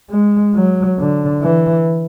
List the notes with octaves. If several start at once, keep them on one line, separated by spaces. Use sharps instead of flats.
G#3
F#3
D3
E3